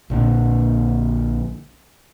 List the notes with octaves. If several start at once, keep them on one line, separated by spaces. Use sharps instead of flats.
A#1 A#2 D3